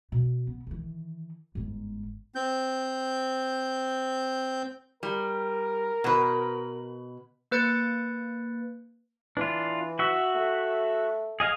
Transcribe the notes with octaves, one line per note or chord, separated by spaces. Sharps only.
B2
B3
D#3 E3
G1 G#2
C4 G6
G3 A#4
B2 B4
A#3 B4 G6 A6 C#7
E3 D4 F4
F#4 E5
A3
G#4 D#5 F5